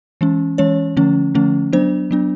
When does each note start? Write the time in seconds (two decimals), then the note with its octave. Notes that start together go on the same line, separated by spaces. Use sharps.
0.21 E3 G#3 C#4
0.58 E3 G#3 C#4 C#5
0.97 D3 F3 A3 C#4
1.35 D3 F3 A3 C#4
1.73 F#3 B3 D4 C5
2.11 F#3 B3 D4